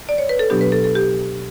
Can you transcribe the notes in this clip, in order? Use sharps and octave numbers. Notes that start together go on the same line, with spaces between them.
D5
C#5
B4
A4
B2 F#3 B3 D4 G4
B4
A4
A4
G4